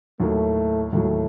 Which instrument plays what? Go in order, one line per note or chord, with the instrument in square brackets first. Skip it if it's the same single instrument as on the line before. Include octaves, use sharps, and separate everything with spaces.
[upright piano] D#2 D#3 F#3 [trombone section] A2 A3
[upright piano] D#2 D#3 F#3 [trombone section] A2 A3